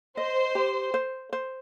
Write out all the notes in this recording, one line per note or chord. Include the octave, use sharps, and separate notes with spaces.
C5 D#5
G4
C5
C5